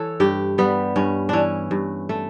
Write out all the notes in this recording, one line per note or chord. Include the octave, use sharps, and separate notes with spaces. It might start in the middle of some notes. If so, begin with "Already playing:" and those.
Already playing: E3 A4 C#5
G2 G4
G3 B3
G2 C#4
E3 C#4 D4
G2
A3